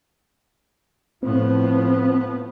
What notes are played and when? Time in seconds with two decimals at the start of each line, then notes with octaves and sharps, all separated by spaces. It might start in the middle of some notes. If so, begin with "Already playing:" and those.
1.23 A2 F3 B3 C4